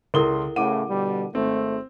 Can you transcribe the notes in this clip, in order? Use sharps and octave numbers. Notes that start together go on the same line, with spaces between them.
C#2 E4 A4 A#4 C6 G7
A2 C#3 F#5 D6 D#7
B2 D3 G3
G#1 A3 C4